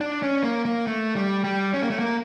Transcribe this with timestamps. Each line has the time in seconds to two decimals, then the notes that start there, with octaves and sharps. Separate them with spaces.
0.01 D4
0.22 C#4
0.43 A#3
0.65 A#3
0.87 A3
1.16 G3
1.44 G3
1.74 C#4
1.82 A#3
1.90 A3
1.99 A#3